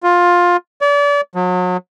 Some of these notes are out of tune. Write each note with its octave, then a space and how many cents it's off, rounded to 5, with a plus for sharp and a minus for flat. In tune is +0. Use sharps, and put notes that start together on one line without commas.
F4 +15
D5 -35
F#3 -35